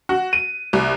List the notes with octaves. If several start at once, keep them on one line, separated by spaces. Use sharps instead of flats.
F#4
D#7
C2